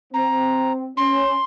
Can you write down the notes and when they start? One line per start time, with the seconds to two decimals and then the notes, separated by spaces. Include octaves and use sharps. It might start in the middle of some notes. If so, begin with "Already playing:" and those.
0.13 C4 A#5
0.97 C#4 C6